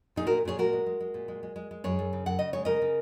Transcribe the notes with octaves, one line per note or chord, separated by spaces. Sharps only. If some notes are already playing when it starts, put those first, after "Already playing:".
A#2 D#4 G#4
A#2 F#4 A#4
A#2 G#4 C#5
G#3 F#4 A#4
G#3
G#3
G#3
A#2
G#3
G#3
G#3
G#3
F#2 G#4 C#5
F#2
C#3
F#2 F#5
C#3 D#5
G#3 C#5
C#3 A#4 D#5
C#3